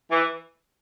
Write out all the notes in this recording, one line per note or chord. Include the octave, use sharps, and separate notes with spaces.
E3